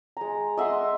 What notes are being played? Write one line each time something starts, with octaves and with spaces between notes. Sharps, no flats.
G#3 A#5
D#5 E5 F#5 C6